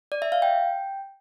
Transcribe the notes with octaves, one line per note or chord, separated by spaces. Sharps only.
D5
E5
F5
G5